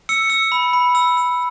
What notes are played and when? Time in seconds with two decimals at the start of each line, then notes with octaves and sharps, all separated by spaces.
0.09 E6 C#7
0.30 E6
0.52 B5
0.73 B5
0.95 E6
1.17 E6